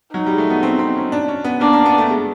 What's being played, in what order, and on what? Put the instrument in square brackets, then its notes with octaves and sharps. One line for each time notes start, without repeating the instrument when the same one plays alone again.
[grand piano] F#3 [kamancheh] D#4
[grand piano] G3
G#3
A3
B3
C4
C4
C#4
D4
C#4
B3
[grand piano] A#3 [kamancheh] D4
[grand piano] A#3
B3
A3
G#3